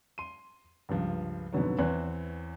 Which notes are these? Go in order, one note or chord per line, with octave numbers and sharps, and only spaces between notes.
C6 D#7
C#2 G2 F3
F2 G#2 B2 D3 F#3 B3
E2 C4 B4 C#5 F#6